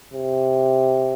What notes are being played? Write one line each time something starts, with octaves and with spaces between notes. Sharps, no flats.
C3